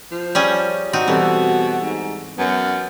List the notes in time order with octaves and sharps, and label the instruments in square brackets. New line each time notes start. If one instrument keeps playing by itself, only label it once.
[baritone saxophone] F3
[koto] G3 C#4 G#4
[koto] C4 D#4 [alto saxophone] F#4
[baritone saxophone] B2 [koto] E3 [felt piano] G3 C4 A4
[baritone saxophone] G#2
[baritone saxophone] F#2 [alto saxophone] B3